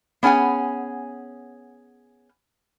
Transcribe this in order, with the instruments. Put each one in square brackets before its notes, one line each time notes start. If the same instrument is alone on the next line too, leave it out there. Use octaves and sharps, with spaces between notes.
[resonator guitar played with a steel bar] B3 C#4 G#4 F#5 G#5